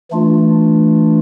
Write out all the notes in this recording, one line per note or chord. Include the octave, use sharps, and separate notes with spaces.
E3 A3 D4 F4